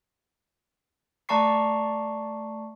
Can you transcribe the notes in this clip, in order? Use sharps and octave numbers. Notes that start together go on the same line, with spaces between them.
A3 D5 A5 A#5 C#6 C7